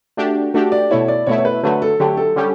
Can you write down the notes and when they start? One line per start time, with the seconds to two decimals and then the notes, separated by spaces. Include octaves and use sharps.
0.17 A3 D4 F#4 G4
0.54 A3 D4 F#4 G4
0.72 D5
0.91 B2 A3 E4 C#5
1.08 D5
1.27 B2 A3 E4 C#5
1.38 C#5
1.45 B4
1.63 D3 F#3 A3 B4
1.82 A4
2.00 D3 F#3 A3 G4
2.17 A4
2.36 D3 G3 C#4 G4